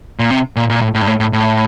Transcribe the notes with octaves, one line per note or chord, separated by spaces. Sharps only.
A#2
C3
A#2
A#2
A2
A2
G2
A2
A2
A2